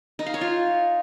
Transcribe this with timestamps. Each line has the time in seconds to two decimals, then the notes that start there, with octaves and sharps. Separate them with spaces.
0.19 D#4
0.26 F5
0.34 C#5
0.41 F4